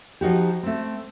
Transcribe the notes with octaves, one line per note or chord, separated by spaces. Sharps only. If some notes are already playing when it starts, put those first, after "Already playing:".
F3 D#4 F#4 G4
A3 C4